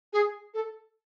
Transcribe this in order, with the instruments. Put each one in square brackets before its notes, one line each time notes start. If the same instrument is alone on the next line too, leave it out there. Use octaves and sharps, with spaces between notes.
[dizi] G#4
A4